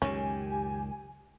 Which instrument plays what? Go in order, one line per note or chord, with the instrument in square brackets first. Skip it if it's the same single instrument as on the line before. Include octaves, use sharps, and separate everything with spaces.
[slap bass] C#2 F#2 D#3 [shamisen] C#4 [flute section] G4 G#5